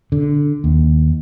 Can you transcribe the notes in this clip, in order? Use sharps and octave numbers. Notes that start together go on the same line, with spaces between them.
D3
D#2